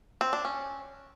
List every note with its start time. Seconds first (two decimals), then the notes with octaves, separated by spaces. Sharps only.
0.21 C4
0.33 D4
0.45 C#4